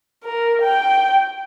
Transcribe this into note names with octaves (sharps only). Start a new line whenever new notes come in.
A#4
G5